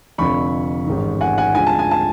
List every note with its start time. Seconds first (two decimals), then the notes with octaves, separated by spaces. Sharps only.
0.18 F1 F2 D3 F3 B5 C#6
0.87 A1 G#2 D#3
1.21 F#5 G#5
1.38 F#5 G#5
1.55 D2 D3 F3 G#3 G#5
1.67 A5
1.79 G#5
1.91 A5